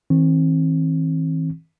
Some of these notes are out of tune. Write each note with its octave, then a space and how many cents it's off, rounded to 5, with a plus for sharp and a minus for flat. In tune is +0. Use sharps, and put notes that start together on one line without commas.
E3 -45 C4 +30